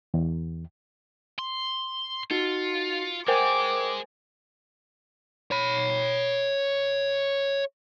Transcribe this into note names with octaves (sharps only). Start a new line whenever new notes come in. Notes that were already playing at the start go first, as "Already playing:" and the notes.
E2
C6
D#4 F4 F#4 C#7
G#3 A#4 C5 G5 G#5 D6
C#5 B5